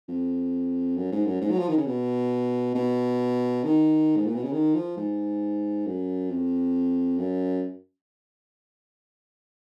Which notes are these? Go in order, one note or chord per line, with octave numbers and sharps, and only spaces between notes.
F2
F#2
G#2
F#2
G#2
F#3
F3
D#3
C#3
B2
B2
D#3
G#2
A#2
B2
C#3
D#3
F3
G#2
F#2
F2
F#2